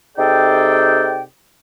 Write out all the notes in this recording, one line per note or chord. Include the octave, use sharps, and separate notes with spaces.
C3 D#4 G#4 A4 D5 G5